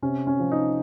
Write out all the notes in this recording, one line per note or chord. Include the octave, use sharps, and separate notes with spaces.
C3 C#4
C#4
F3
D#4